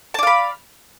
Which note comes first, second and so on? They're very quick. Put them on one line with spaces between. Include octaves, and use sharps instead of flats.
A5 D5 F5 B5